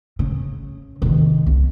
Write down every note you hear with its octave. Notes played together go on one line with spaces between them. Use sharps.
C#3
C3 D#3
C2